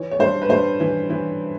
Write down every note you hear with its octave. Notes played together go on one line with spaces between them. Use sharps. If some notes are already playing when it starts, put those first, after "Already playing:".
Already playing: E3 C#5
C#5
G2 C5
B4
G2 C5
E3
E3